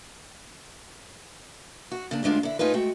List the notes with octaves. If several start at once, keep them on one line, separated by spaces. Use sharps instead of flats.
F#4
C#3 A#3 D4
D2 D3 G#3 D4 F4
D3 E4
A2 D#4 F4 G#4 B4
G#3 A3 F#4 G5